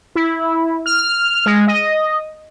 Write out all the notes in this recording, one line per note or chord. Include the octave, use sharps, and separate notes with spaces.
E4
F6
G#3
D#5